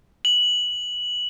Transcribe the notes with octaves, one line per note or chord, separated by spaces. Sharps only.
F#7